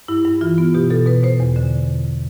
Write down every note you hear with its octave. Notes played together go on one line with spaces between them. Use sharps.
G2 E4
G2
E3 F4
B3
B2 G4
B2 A4
B2 B4
B2 C5
E2
D3